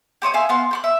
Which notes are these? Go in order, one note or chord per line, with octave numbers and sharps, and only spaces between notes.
G4 C5 C#5 D#6
E5 F5 G#5
B3 F5 C6
G5 C6 F#6
E5